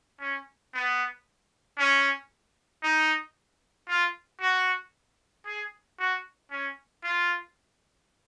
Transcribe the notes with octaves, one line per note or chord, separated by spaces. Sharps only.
C#4
B3
C#4
D#4
F4
F#4
G#4
F#4
C#4
F4